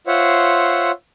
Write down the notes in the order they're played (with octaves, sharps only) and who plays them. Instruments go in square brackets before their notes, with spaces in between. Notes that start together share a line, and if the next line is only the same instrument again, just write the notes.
[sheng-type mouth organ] F4 C5 C#5 E5 F#5